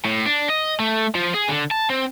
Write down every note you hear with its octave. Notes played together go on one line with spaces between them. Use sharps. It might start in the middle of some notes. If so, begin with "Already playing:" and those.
A2
D4
D#5
A3
F3
G#4
D3
A5
C4